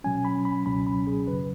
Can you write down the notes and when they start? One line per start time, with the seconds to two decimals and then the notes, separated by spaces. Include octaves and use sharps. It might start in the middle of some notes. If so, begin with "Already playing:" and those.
0.04 B2 F#3 C#4 G#5
0.25 B5
0.45 B5
0.66 C#2 B2 F#3 C#4 B5
0.87 B5
1.07 G#4
1.27 F#2 C#3 F#3 B4